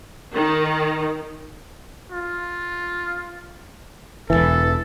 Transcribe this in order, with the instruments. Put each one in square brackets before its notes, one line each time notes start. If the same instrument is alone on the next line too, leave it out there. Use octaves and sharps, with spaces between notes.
[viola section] D#3
[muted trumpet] F4
[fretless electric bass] E1 B1 E3 [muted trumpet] A4